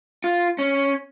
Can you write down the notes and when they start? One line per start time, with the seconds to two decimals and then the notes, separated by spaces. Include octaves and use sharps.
0.24 F4
0.59 C#4